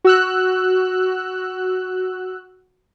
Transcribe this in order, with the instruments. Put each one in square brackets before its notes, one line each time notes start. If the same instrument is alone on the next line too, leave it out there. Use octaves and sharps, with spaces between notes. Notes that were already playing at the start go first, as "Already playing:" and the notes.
[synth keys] F#4 E6 F#6